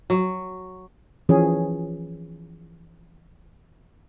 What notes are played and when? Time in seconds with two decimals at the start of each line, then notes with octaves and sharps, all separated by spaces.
0.10 F#3
1.29 E3 F3 C#4 G#4